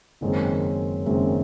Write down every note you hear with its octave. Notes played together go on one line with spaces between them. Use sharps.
F#1 F#2 D#3 G#3 C4
F#1 F#2 D#3 G#3 C4